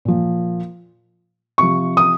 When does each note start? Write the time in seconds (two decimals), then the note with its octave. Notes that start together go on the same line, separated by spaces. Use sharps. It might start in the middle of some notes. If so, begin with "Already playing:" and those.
0.05 A#2 F3
1.58 C3 F3 C#6
1.97 D#6